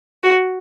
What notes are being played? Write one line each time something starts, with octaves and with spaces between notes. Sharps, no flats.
F#4